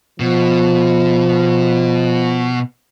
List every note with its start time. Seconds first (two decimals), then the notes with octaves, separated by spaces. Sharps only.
0.20 B2 F3